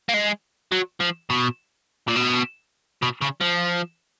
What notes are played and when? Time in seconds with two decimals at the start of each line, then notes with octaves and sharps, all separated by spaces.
0.09 A#3
0.14 G#3
0.72 F#3
1.00 F3
1.30 B2
2.08 A#2
2.16 B2
3.02 B2
3.21 C#3
3.41 F3